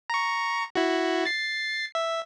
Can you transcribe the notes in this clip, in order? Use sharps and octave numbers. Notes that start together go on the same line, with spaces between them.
A#5 C#6
E4 F#4
A6 C7
E5